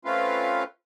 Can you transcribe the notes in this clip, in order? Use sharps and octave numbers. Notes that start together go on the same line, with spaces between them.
A3 C4 C#4 F4 B4 F5